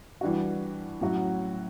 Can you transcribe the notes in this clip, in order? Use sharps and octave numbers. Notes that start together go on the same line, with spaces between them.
E3 G3 D4 F#4
A2 F#3 C#4 F#4